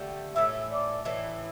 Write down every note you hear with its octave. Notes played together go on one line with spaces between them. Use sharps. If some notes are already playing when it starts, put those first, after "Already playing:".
Already playing: D3 A3 G4
A2 E3 A3 E5
D5
A2 E3 A3